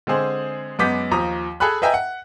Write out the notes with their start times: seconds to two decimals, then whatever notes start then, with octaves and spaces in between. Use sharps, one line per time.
0.07 D3 G#3 C4 G#4 C5
0.79 F#2 G#3 B3 D6 G6 B6
1.11 D#2 F3 A#5 D#6
1.60 G#4 A4 G#5 B5 F#6
1.82 B4 D#5 E5 G5 G#5 A#5
1.94 F#5